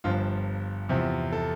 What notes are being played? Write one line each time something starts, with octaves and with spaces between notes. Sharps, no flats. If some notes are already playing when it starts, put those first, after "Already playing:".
G1 G2 F3 F4
E2 C3 F3
A4